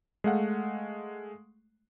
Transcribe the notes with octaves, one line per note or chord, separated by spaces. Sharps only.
G#3 A3 F5 F#5